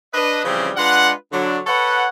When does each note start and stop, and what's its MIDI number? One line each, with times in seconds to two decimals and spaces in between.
0.14 0.44 62
0.14 0.44 71
0.14 0.44 75
0.45 0.71 49
0.45 0.71 52
0.45 0.71 53
0.45 0.71 55
0.45 0.71 60
0.45 0.71 61
0.77 1.13 56
0.77 1.13 62
0.77 1.13 65
0.77 1.13 71
0.77 1.13 78
1.32 1.59 50
1.32 1.59 54
1.32 1.59 62
1.67 2.07 69
1.67 2.07 71
1.67 2.07 73
1.67 2.07 78